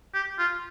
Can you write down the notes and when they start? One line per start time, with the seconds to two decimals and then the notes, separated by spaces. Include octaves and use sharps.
0.14 G4
0.39 F4